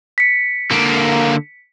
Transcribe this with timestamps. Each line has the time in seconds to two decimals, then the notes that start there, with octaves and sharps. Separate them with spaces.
0.18 B6 C#7
0.71 D3 A#3